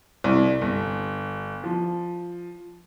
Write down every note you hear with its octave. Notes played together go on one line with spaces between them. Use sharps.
C2
G1
F3